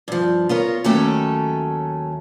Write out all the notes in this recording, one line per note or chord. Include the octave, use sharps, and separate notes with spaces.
G2 F3
B3 F4 A#4 C#5
D#2 F#3 A3 C#4 A4 G5